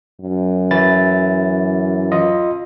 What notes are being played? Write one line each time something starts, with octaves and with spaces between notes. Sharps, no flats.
F#2
E3 E4 A6
F4 D#5